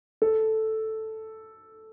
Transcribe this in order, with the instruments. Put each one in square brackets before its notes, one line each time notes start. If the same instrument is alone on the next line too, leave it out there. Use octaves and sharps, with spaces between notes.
[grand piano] A4